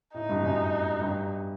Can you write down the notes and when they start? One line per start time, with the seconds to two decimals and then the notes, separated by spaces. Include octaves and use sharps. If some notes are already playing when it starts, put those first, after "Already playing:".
0.14 A2 D#4
0.29 G2
0.43 F#2
1.01 G2